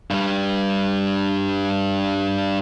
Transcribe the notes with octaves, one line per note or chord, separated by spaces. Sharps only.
G2 G3